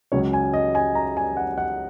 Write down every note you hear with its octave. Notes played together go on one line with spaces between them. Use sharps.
C#2 C#3 F#3 C#5
G#5
D#5
G#5
A#5
G#5
F#5
F#5